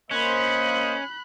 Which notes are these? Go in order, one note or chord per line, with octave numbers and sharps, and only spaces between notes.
A#3 C#4 C5 D#5 B5 F#6